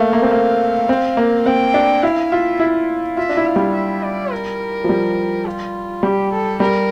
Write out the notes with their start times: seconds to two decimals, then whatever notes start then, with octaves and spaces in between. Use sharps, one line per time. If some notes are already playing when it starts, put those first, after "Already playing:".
Already playing: A3 A#3 F5
0.13 A#3
0.22 C4
0.31 A#3
0.89 C4
1.17 A#3
1.46 C4 G5
1.74 D4
2.03 E4 F5
2.31 F4 E5
2.60 E4
3.17 F4 E5
3.29 D4
3.37 E4
3.46 F5
3.56 G3
3.74 E5
4.03 D5
4.32 A#4
4.84 F3
4.89 G3
5.46 F4
6.03 G3 G4
6.32 A4
6.60 G3 A#4